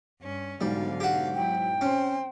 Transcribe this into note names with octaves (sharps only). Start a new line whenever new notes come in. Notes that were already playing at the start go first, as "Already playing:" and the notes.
G2 C#4
B1 G#2 D3 G3 F5
F#4 G4
F#3 E4 G5
C4 C#4 C5